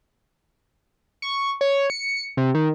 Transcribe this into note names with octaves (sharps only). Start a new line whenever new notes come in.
C#6
C#5
C#7
C3
D#3